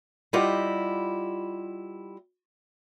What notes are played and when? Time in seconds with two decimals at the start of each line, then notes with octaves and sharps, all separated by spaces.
0.33 G3 E4 F4 G4 D#5 F#5